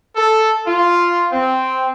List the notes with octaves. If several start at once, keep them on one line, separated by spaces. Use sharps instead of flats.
A4
F4
C4